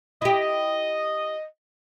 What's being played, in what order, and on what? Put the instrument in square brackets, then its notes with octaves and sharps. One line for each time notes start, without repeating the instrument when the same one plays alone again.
[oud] E4 G4 [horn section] D#5